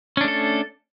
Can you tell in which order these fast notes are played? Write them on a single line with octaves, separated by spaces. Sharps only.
C#4 D4 A3 A4